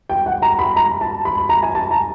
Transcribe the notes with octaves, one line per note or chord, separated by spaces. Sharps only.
G5
F#5
A#5
B5
A#5
A5
B5
B5
A#5
G#5
A5
A#5